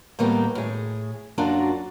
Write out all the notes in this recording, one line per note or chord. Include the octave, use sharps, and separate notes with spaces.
A2 D#3 G3 A#3 B3 G4
A2 G#4
F#2 A#3 D4 F4 F#4 A#4